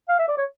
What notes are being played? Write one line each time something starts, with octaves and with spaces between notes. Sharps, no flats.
F5
E5
D5
C#5